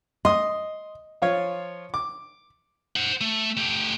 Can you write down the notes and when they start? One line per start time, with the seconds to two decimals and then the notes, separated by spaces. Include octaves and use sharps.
0.25 D#5 C6 D#6
1.22 F3 F4 C#5
1.94 D6
2.96 C5 F#5
3.21 A3
3.57 A3 G4